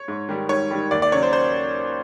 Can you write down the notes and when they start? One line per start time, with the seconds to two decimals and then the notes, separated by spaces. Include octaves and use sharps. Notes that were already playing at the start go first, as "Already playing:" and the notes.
Already playing: C#5
0.08 G#2
0.29 D#3 G3
0.49 G#2 C#5
0.71 D#3 G3
0.91 D#2 D5
1.02 D5
1.12 C#3 F#3 C#5
1.23 C5
1.33 C5